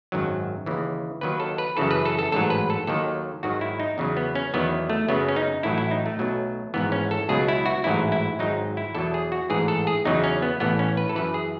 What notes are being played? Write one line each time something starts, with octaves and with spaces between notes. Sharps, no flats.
G#1 F#2 D#3 F#3
D#2 C#3 E3
D#2 D#3 F#3 B4
A4
B4
F#2 C#3 E3 A4
B4
A4
A4
A1 G#2 F#3 A4
B4
A4
D#2 D#3 F#3 A4
G#1 G#2 D#3 F#3 F#4
E4
D#4
E2 C#3 F#3
B3
C#4
E2 D#3 F#3 B3
A3
F#2 C#3 F#3 B3
C#4
D#4
A1 A2 F#3 E4
E4
D#4
A3
B1 B2 F#3
G#1 G#2 E3 B3
C#4
A4
C#2 B2 F#3 G#4
E4
F#4
A1 G#2 F#3 E4
E4
G#1 G#2 F#3 D#4
E4
E2 B2 F#3 A4
G#4
F#4
A1 G#2 E3 G#4
A4
G#4
E2 C#3 F#3 D#4
C#4
B3
A1 A2 E3 B3
C#4
B4
A4
F#2 E3 B4
G#4